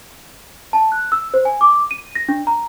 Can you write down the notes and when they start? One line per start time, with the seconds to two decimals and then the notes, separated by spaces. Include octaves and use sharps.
0.73 A5
0.92 F#6
1.12 E6
1.34 C5
1.45 G#5
1.61 D6
1.91 D#7
2.15 A#6
2.29 D4
2.47 A#5